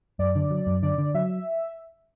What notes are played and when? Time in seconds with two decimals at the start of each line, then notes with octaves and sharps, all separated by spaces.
0.19 F#2 D5
0.36 D3
0.51 F#3
0.67 F#2
0.82 D3 D5
0.98 D3
1.15 F#3 E5